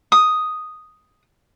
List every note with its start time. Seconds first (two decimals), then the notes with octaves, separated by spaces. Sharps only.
0.12 D#6